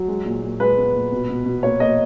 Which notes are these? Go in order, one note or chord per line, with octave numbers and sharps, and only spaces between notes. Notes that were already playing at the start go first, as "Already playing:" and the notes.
Already playing: F#3
G#3
A#2
A#2
G#3 B4
B3
A#2
B2
B2
B2
A#3 C#5
A#3 D#5